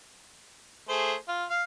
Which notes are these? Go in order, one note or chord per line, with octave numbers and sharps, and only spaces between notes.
A3 G#4 C5
F4
F5